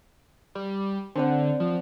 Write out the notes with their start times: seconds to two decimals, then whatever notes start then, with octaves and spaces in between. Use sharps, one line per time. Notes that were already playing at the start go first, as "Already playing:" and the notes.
0.55 G3
1.15 D3 C4 D5 F#5
1.60 F3